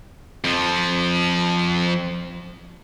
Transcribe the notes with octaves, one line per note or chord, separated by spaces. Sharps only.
F2 F3